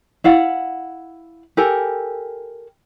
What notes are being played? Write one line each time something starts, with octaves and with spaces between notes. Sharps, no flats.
E4 F5 F#5
G4 A4 A#4 G#5